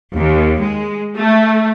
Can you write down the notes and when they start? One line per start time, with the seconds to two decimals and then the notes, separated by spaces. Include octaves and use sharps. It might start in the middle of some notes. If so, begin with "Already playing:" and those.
0.14 D#2
0.60 G#3
1.18 A3